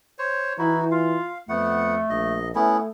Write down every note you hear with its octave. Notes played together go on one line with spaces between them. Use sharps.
C5 C#5
E3 D#4 E4 F#4
F4 F5
F2 A3 B3 F#5
A#1 D#5
A3 B3 C#4 E4